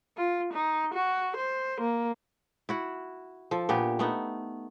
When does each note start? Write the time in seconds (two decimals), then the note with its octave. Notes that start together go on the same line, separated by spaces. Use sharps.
0.17 F4
0.53 D#4
0.94 F#4
1.37 C5
1.81 A#3
2.69 E4 F#4 F#5
3.51 F3 A4
3.69 A#2 B3 D4 G4
3.99 A3 B3 D#4